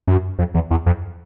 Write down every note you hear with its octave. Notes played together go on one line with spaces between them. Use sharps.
F#2
F2
E2
E2
F2